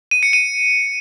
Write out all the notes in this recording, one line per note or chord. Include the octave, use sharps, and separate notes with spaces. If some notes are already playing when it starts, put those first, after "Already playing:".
D#7
C#7
D#7